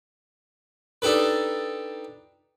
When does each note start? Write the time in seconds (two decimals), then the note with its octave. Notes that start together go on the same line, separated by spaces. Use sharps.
1.02 D4 D#4 G4 A4 B4